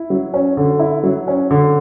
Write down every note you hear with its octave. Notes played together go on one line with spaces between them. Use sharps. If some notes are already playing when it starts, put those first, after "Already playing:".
Already playing: E4
F#3
C#4
D3
E4
F#3
C#4
D3